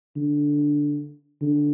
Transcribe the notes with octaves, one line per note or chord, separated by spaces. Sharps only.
D3
D3